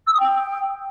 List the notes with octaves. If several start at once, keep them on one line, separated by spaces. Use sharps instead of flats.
E6
D#6
G5